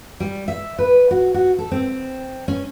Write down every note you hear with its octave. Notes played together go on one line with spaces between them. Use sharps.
G3
E5
B4
F#4
F#4
A4
C4
C#4